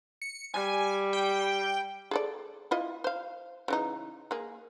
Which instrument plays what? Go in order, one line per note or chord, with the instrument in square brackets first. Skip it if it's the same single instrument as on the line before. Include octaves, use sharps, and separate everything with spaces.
[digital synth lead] C#7
[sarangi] G3 [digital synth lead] G#5
[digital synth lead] G5
[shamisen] G#4 A4 D5
E4 F4 D#5
C5 F5
C#3 E3 D#4
A#3 G#4